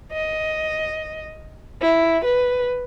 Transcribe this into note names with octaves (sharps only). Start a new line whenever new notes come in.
D#5
E4
B4